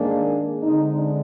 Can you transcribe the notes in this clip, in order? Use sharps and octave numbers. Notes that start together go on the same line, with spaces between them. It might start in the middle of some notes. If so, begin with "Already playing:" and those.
Already playing: G#2 D#3 A#3 D4 G#4
D3 G#3 C4 D#4
D4